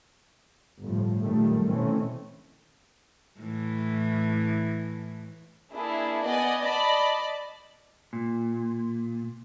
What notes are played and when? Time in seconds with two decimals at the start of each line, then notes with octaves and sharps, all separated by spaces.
0.83 G1 A2 F3
1.22 A#1 F#2 D#3 G3 A3
1.69 B2 D#3 E3 A3 C4 C#4
3.39 A2 E3
5.74 A#3 D4 E4 G#4
6.25 B3 D5 D#5 G#5
6.63 D5 D#5 A5 B5
8.13 A#2